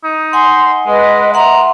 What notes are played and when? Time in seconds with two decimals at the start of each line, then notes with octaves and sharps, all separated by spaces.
0.04 D#4
0.33 F#5 G#5 C6
0.87 G#3 B4 D#5
1.34 E5 F#5 A#5 C6